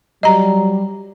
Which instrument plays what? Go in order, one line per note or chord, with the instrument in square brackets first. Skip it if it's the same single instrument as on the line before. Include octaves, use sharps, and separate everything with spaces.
[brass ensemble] F#3 G3 [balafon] D#5 A#5